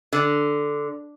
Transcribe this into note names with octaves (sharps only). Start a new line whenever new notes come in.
D3